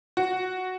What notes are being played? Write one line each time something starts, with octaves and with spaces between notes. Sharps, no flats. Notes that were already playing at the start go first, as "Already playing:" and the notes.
F#4